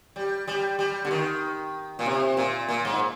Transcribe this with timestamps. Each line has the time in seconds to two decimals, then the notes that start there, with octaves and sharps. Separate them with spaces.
0.16 G3
0.48 G3
0.79 G3
1.05 D3
1.11 D#3
1.99 A#2
2.06 C3
2.37 A#2
2.68 A#2
2.85 G#2